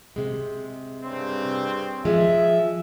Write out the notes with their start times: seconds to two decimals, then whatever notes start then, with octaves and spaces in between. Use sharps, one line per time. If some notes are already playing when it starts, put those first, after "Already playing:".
0.16 C3 G#3
1.03 G2 C#3 C4
2.05 F3 G#3 E5